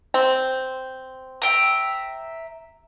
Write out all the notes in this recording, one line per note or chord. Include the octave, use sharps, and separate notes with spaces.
C4
E5 G5 A#5